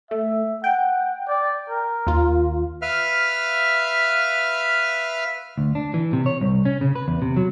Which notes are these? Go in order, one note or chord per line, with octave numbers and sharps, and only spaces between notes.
A3 E5
F#5 G5
D5
A#4
D#2 F4
B4 E5 F5 F6
D2
D4
E3
C3
C#5
C2
C#4
C#3
B4
E2
C3
F#3